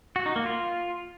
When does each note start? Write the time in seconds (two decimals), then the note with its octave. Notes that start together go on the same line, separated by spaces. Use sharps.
0.16 F#4
0.26 D#4
0.36 A#3
0.46 F4